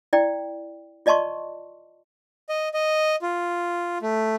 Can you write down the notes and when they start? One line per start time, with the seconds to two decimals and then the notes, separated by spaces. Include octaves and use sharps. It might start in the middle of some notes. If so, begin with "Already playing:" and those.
0.13 E4 D5 G5
1.06 F4 D5 D#5 A5 C6 C#6
2.49 D#5
2.74 D#5
3.22 F4
4.02 A3